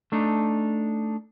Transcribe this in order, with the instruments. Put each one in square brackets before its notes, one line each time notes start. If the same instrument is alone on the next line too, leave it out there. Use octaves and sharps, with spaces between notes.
[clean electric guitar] A3 D4 D#4